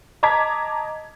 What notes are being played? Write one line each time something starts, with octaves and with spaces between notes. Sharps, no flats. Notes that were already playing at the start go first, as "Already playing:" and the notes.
D#5 A5 A#5 D6 G#6 B6